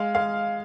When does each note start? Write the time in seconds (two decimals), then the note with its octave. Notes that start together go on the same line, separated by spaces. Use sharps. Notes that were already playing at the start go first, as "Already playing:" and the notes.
Already playing: G#3 F5
0.15 G#3 F5